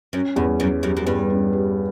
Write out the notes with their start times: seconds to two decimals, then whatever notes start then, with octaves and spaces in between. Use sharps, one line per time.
0.13 F#2 C#4
0.36 E2 G2
0.60 F#2 C#4
0.83 F#2 G3
0.97 F#2
1.06 E2 G2
1.30 C#4
1.53 G3